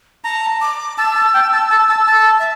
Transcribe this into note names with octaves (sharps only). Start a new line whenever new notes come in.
A5 A#5
D6
A5 E6
A5
G5
A5
A5
A5
A5
E5